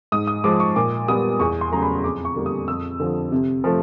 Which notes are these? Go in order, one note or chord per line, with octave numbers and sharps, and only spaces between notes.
G#2 D#6
D#6
F3 G#3 D6
C#6
A#2 D6
G3 B3 D#6
E2 C#6
C6
C#3 F#3 A3 A#5
B5
F2 D6
C#6
D3 G3 A#3
D#6
F2 E6
D3 F3
C3
F3 A3